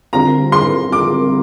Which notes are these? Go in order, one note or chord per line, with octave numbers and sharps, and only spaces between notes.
D3 G3 C4 F4 A#4 A#5
C6
D6